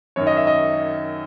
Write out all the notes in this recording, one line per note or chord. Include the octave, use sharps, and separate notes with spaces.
F#2 D#3 C#5
D#5
E5
D#5